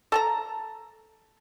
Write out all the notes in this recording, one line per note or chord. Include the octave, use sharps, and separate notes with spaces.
A4 A5 A#5